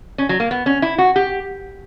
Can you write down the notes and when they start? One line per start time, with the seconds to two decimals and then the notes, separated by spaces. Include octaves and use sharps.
0.18 C#4
0.29 F#3
0.40 A#3
0.51 B3
0.66 C#4
0.82 E4
0.98 F#4
1.16 G4